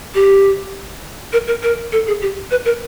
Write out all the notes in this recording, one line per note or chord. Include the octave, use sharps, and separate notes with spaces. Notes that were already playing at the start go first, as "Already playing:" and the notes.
G4
A#4
A#4
A#4
A4
G#4
G4
B4
A#4